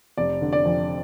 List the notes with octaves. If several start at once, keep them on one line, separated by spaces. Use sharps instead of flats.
F1 D5
D3
D5
F2